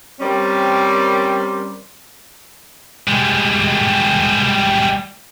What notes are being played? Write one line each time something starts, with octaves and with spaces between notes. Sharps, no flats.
G3 C4 C#4 A#4 C5 D5
G3 G#3